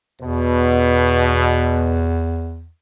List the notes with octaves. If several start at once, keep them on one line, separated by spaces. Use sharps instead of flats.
E2 B2